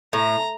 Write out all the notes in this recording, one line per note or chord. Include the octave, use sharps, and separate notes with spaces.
A2 A#5